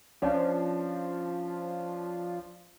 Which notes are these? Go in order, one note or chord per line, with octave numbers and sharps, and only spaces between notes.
F3 C#4 D4